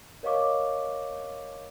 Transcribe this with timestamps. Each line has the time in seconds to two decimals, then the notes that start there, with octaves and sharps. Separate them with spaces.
0.23 A#4 C#5 D#5 F5 C#6 D6